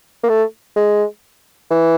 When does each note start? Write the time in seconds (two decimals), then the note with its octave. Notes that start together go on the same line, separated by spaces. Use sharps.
0.23 A#3
0.29 A3
0.76 G#3
1.71 E3